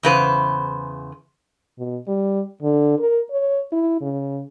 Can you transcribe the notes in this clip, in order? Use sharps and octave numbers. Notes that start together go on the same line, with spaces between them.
E2 C#3 B4 C5
B2
G3
D3
A#4
C#5
E4
C#3